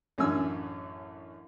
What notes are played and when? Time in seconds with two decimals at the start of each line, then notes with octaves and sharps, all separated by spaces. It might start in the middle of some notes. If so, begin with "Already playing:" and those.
0.18 A1 F#2 D4 G#5 E6